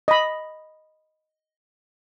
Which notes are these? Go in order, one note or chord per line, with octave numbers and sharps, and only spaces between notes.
D#5 B5